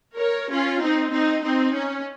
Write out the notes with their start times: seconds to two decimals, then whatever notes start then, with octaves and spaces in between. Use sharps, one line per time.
0.17 A#4 C#5
0.49 C#4 F4
0.81 C4 D#4
1.11 C4 D#4
1.44 C4 D#4
1.74 C#4